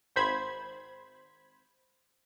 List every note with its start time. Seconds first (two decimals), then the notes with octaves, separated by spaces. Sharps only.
0.16 G#1 C5 B5 G#6